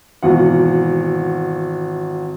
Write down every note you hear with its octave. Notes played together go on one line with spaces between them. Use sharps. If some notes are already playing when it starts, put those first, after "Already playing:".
G#1 B2 E3 F4 F#4 F#5